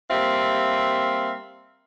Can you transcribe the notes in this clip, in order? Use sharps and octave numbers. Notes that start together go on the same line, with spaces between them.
G3 A#3 C4 E5 F5